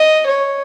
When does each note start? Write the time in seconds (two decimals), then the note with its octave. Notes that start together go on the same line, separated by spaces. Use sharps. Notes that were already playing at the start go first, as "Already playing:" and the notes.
Already playing: D#5
0.26 C#5